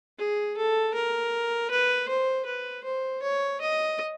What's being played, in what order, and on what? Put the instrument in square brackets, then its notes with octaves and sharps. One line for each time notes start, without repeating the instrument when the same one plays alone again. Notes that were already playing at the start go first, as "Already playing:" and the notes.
[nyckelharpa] G#4
A4
A#4
B4
C5
B4
C5
C#5
D#5